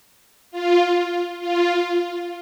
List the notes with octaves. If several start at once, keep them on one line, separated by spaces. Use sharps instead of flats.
F4
F4